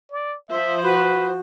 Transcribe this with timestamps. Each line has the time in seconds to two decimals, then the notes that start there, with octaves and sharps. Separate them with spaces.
0.11 D5
0.50 F3 C5 E5
0.83 F#4 B4